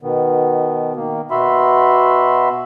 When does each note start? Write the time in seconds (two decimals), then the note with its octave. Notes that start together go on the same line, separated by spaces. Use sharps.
0.02 B2 D#3 B3
0.96 D#3 A#3
1.31 B2 F#4 E5 B5 C6